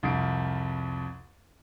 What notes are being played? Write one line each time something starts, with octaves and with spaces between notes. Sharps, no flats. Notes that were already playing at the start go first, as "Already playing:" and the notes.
C2 F2 C7 D7